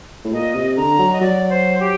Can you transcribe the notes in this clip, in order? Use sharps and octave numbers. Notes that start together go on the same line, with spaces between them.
A2
A#2 D#5
C3
D3 A#5
F#3
D#5
F#3 D5
C5
G4